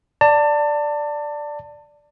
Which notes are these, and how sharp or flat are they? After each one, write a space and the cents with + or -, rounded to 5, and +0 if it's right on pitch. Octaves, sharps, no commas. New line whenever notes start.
D5 +0 A5 +25